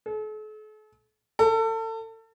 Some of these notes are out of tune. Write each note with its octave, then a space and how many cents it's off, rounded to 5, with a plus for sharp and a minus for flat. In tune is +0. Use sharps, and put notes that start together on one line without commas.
A4 -45
A4 +30